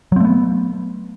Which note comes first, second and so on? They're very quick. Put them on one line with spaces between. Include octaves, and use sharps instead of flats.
F#3 C4 A3 B3